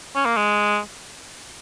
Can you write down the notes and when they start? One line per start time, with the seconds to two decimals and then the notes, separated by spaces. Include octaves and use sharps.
0.15 C#4
0.25 A#3
0.36 G#3